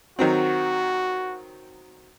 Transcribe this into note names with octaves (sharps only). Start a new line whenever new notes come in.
D#3 F#3 C4 F#4